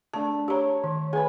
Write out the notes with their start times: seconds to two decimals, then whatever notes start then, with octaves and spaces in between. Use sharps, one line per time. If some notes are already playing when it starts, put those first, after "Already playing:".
0.14 A3 D4 A5
0.48 G4 C#5 A#5 D6
0.84 D#3
1.13 G#4 B4 G#5 B5